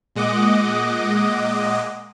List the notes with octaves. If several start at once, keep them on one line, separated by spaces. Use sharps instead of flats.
A#2 G#3 D#5 F#5 D6